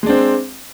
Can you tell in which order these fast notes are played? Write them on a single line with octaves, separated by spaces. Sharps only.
G#3 D4 C4